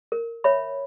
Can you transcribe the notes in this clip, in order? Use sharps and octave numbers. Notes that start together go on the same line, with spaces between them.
A#4
C#5 E5 B5